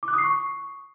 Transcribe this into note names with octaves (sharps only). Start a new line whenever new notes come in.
D6
F#6
D#6
C7
C#6